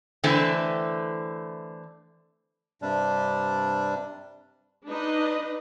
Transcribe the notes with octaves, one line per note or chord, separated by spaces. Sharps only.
D3 E3 A3 C4
G2 C3 G3 D4
D4 D#4 B4 D#5